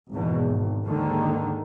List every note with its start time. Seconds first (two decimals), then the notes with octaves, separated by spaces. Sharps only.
0.11 G#1 E2 B2
0.48 G#1
0.83 D#2 G#2 D3 D#3